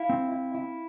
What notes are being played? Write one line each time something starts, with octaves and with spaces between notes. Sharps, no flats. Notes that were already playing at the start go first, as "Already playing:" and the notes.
Already playing: E4 F5
C4
E4
E4